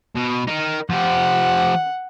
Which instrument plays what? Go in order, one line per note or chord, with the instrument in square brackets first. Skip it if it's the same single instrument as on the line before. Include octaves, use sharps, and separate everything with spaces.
[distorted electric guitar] B2
D#4 A#4
[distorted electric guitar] F3 G4 [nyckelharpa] F#5